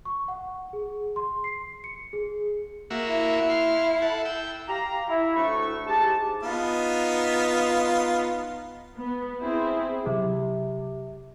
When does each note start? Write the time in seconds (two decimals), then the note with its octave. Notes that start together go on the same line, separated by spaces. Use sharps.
0.05 C#6
0.28 F#5
0.73 G#4
1.16 C6
1.44 C7
1.84 C#7
2.13 G#4
2.90 A#3 F#4 E5
3.07 E4
3.50 F5 C6
4.02 A4 F#5
4.25 G5 E6
4.68 G4 F5 A#5
5.08 E4
5.36 D2 A2 A3 D4 A4 C#6
5.86 G#2 G4 A5
6.43 B3 D#4 F4
8.97 B3
9.41 C4 E4 G#4
10.06 C3 F#3